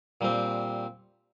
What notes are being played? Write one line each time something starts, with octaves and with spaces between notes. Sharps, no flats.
A#2 G3 C4